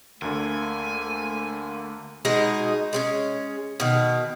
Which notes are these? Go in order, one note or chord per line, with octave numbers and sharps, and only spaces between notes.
D2 D3 A3 A#3 G#5
B2 G#3 D#4 G#4
G#3 C4 C#4
B2 D#3